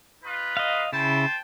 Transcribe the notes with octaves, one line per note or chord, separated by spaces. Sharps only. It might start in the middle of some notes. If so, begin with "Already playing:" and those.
D#4 F4 B4
D#5 F5
C#3 E4 C5 G5 A5